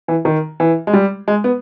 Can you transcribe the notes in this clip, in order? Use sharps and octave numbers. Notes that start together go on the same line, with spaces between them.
E3
D#3
E3
G#3
G3
G#3
B3